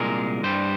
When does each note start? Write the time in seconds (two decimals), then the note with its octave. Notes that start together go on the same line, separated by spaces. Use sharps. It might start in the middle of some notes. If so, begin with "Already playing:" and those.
Already playing: C2 A#2 G#3 A#4
0.43 G2 G3 C5